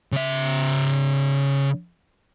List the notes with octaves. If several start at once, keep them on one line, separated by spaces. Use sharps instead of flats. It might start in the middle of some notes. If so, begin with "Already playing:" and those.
C#3 E5